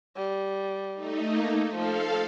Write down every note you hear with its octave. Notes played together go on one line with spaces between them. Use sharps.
G3
A3 D#4
A#3
F3 A4 F5